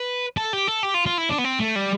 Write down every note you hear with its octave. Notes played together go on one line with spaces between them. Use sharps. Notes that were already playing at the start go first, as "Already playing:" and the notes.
Already playing: B4
A4
G4
A4
G4
F4
F4
E4
D4
B3
C4
A3
G3